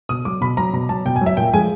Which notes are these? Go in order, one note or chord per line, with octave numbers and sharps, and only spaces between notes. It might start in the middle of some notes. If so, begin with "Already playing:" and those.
B2 D#6
F#3 D6
B2 B5
F#3 A#5
B2 A#5
F#3 A5
B2 G5
G#5
F#3
E5
A#2 G5
F3 G#3 G#5